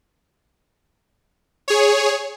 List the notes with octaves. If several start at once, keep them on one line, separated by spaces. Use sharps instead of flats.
G#4 C#5